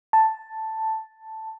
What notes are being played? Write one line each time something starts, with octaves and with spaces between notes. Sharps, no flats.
A5